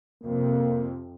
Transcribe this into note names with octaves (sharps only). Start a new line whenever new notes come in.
F2 C3 A#3